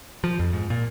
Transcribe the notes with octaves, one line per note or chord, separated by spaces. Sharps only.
F3
F2
G#2
A#2